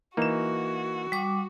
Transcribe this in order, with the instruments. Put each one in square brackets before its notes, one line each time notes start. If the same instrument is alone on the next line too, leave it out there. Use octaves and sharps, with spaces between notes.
[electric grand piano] E3 E7 [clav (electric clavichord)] A#3 D#4 [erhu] F#4
[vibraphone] G3 D6